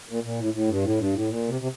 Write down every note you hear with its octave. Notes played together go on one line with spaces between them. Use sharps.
A#2
A#2
A2
A2
G2
A2
G2
A2
A#2
C3
C3